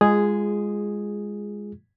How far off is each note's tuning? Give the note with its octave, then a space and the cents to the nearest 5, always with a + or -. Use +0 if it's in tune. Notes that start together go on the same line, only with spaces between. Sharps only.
G#3 -15 F4 +0 G#4 +0